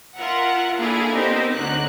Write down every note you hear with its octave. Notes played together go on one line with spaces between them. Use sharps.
F4 A#4 E5 F#5
A#3 D4 E4 G#4 A4 F5
B3 C4 D#4 G4 A#4 C5
D2 D3 F#3 D#4 A#4 F#6